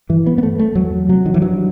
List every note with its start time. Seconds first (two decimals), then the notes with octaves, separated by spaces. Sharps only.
0.09 G2 E3
0.27 B3
0.38 B3
0.43 A3
0.59 A3
0.75 E2 F#3
1.08 C3 F#3
1.26 D#3
1.34 E3
1.41 G2 F#3